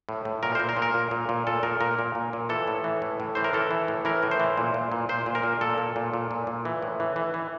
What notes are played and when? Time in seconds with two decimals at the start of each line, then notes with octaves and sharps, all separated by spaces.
0.09 A2
0.25 A2
0.43 A#2 A#4
0.55 C5
0.60 A#2
0.69 A#4
0.77 A#2
0.82 A#4
0.94 A#2
1.11 A#2
1.29 A#2
1.47 A#2 A4
1.63 A#2 A#4
1.80 A#2 A#4
1.99 A#2
2.15 A#2
2.33 A#2
2.49 E3 A4
2.68 A2
2.84 E3
3.02 A2
3.20 A2
3.35 E3 C5
3.44 A#4
3.53 E3 A4
3.71 E3
3.88 A2
4.05 E3 A#4
4.23 A2
4.31 C5
4.40 E3
4.57 A#2
4.74 A#2
4.92 A#2
5.09 A#2 C5
5.26 A#2
5.35 A#4
5.43 A#2
5.61 A#2 A4
5.78 A#2
5.96 A#2
6.14 A#2
6.31 A#2
6.47 A#2
6.65 E3
6.82 A2
7.00 E3
7.16 E3
7.34 E3